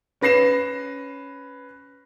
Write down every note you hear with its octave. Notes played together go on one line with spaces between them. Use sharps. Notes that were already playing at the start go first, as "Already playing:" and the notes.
C#4 B4 A#6 C7 E7